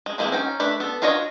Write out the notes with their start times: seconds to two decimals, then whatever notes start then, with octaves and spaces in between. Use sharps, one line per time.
0.06 G#3
0.18 D#3 E3 G#3 A#3 C4
0.32 C#4 D#4 G5
0.60 A3 D4 B4
0.80 B3 A4
1.02 D4 F4 F#4 C#5 D#5